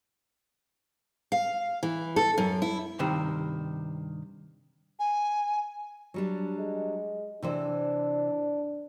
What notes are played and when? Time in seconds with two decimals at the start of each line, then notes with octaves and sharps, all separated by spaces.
1.32 F5
1.83 E3
2.16 A4
2.38 F#2
2.62 E4
2.99 G2 C3 D#3 C5
4.99 G#5
6.14 F#3 G3 D4
6.58 G#3
7.42 C3 E3 D4 C5